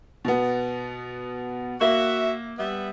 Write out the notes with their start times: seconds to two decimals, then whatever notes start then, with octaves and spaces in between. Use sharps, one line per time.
0.25 B2 B3
1.81 A#3 F#4 E5
2.58 G3 B3 E5